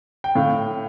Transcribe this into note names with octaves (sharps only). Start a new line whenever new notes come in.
G5
A2 F5